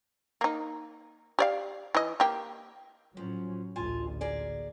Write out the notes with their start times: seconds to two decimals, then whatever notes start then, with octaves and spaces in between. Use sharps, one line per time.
0.41 A#3 D#4
1.39 G4 D5 F5
1.95 E3 D#5
2.20 A#3 G4
3.17 A2 F3 F#3 C#4
3.76 A1 D2 F4 G#5 A5
4.21 A#3 G#4 D5